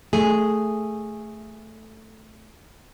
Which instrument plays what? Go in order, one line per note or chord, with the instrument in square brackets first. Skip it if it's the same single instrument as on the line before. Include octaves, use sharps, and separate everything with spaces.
[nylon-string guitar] A3 G#4